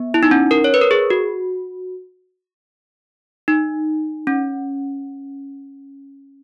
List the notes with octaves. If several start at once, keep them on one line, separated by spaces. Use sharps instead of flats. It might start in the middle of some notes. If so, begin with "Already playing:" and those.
Already playing: B3
E4
D#4
C#4
A#4
C#5
B4
A#4
G#4
F#4
D#4
C#4